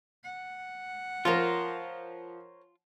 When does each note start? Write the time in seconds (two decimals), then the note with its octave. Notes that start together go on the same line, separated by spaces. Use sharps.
0.24 F#5
1.25 F3 F4 A#4 C5 C#5